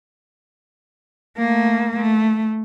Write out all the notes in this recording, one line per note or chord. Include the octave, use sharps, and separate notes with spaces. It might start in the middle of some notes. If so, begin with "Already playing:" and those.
A3 A#3
A3